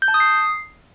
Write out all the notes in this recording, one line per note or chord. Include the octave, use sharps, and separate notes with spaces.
G6
A5
D#6
C7